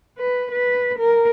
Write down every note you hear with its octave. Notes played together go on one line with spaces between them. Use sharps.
B4
B4
A#4